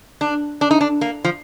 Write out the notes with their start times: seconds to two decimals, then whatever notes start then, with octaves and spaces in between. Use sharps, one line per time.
0.21 D4
0.61 D4
0.71 D#4
0.81 D4
1.01 A#3
1.25 F3